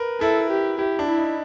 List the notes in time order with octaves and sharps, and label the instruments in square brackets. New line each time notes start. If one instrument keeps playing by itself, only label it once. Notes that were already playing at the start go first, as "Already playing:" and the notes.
Already playing: [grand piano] A#4 B4
[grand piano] E4 [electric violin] A4
[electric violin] G4
[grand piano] E4 [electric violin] G4
[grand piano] D4
[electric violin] E4
[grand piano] D#4